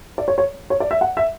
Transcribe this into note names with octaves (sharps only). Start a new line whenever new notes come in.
D5
C#5
C#5
C#5
D5
E5
F#5
E5